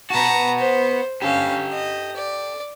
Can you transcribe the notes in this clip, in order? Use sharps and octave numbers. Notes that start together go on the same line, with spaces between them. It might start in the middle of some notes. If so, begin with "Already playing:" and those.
B3 F#4 A5 A#5
C5
C#4 G4 A4 F5
D#5
D5